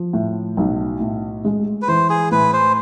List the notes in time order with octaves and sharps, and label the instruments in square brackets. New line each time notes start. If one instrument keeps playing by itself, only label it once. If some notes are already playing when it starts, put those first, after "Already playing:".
Already playing: [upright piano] F3
A2
B1
A2
G#3
[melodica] B4
[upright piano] E3 [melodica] C5
[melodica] G#4
[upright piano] A2 [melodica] B4
[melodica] C5